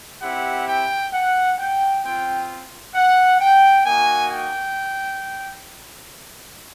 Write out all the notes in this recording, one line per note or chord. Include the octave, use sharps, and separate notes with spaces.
C4 E4 G4 F#5
G5
F#5
G5
C4 F4 G5
F#5
G5
A#3 D#4 F#4 G#5
G5